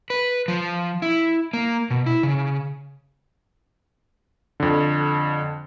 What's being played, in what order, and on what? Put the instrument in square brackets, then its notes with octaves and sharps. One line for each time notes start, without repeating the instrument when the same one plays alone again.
[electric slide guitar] B4
F3
E4
A#3
B2
E4
C#3
[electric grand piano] F2 D3